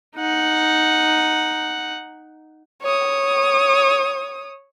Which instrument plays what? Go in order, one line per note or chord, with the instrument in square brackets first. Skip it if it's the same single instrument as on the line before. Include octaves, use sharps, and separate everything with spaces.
[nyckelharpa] D#4 F#5
[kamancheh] C#5 D#6